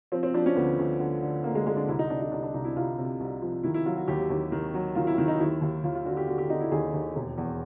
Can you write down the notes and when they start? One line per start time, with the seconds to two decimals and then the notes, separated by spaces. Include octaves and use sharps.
0.12 F3 C4
0.23 C4
0.34 F3 D4
0.46 C#4
0.56 D2 B3
0.79 D2
1.00 D3
1.23 D3
1.44 D3 A#3
1.55 G#3
1.66 D3 G#3
1.77 D4
1.88 C2 E4
1.99 D#4
2.10 C2 D4
2.21 D#4
2.32 C2 D4
2.43 D4
2.54 C2 D#4
2.65 E4
2.76 C2 F4
2.98 C3
3.20 C2
3.42 F3
3.63 D#3 E4
3.74 E4
3.86 F#3 F4
3.97 F#4
4.08 D#2 G4
4.30 D#2
4.52 D#3
4.74 F#3
4.95 D#3 F4
5.07 E4
5.18 D#3 E4
5.28 D#4
5.40 D#2 E4
5.61 D#2
5.84 D#2 F4
5.95 F4
6.05 D3 F#4
6.17 G4
6.27 D3 F#4
6.38 G4
6.49 D3 D#4
6.60 E4
6.72 D#2 G#4
6.94 D#2
7.16 E1
7.38 E2